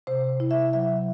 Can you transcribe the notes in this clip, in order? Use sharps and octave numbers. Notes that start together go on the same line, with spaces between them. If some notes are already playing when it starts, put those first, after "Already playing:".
C3 C5
E4
E5
F#3 E5